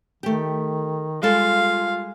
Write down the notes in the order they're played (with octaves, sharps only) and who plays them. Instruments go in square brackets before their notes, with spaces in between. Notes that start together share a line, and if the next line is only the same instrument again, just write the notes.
[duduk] D#3 [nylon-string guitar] A3 G4
[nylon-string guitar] G3 G#3 A4 [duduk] F4 [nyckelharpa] F5